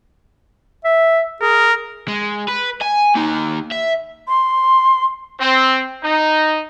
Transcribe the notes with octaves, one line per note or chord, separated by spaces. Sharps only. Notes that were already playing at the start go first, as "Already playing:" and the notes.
E5
G#4 A#4
G#3
B4
G#5
A#3 D#4
E5
C6
C4
D#4